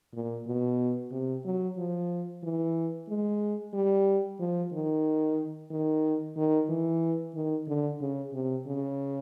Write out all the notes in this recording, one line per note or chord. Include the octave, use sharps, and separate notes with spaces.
A#2
B2
C3
F#3
F3
E3
G#3
G3
F3
D#3
D#3
D#3
E3
D#3
D3
C#3
C3
C#3